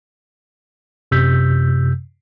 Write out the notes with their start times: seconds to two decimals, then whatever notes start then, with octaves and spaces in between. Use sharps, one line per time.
1.11 F#2 C3 E6 G6 B6